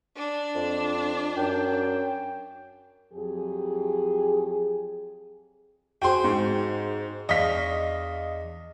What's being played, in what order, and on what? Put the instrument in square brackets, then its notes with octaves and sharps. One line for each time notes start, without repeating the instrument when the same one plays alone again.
[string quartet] D4
[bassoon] F2
[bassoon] F#2 [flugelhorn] G5
[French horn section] F2 F#3 G4 G#4
[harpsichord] F#4 G#4 C5 [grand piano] G5 C6
[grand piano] G#2
[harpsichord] E2 D4 C#6 [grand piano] D#5 F5 B6